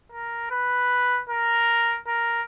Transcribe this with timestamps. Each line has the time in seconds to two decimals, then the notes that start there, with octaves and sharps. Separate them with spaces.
0.12 A#4
0.51 B4
1.29 A#4
2.08 A#4